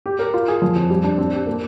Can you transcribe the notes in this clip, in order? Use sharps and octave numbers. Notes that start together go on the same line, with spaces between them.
G4
A#4
F4
G#4
F3
F2
G3
D4
C4
G4
A#3